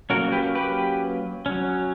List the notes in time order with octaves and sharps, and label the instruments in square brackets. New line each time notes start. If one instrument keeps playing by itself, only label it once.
[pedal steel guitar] F#3 A#3 C#4 F#4 A#4
G4 B4
G4 B4
F#3 C#4